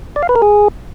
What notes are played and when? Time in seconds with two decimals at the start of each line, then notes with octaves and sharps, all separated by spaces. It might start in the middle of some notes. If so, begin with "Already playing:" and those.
0.16 D5
0.23 F5
0.29 B4
0.36 A#4
0.42 G#4